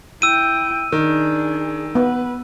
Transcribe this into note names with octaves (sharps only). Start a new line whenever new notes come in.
E4 G5 E6 D#7
D#3 D4 G#4
B3 B4